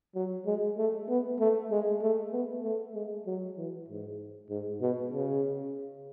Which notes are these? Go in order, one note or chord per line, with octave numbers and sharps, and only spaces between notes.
F#3
G#3
A3
B3
A3
G#3
A3
B3
A3
G#3
F#3
E3
G#2
G#2
B2
C#3